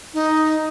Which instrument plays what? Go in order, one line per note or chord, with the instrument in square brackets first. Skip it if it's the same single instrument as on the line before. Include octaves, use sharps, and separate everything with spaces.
[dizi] D#4